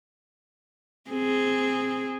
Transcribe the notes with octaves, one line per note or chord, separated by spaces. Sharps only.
C4 G#4